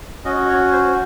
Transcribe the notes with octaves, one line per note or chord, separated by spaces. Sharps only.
C#4 F#4 D#5
C#5
C5